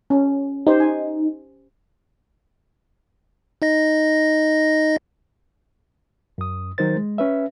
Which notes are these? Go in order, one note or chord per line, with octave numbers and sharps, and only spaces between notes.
C#4
D#4 G4 C5
G#5
D#4 D#5 A#6
F#2 D#6
D#3 F#3 D#4 A#4 C5 A6
G#3
C#4 B4 E5